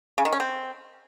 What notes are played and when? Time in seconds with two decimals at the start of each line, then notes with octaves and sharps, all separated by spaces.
0.18 C#3
0.25 D#3
0.32 C#4
0.40 C4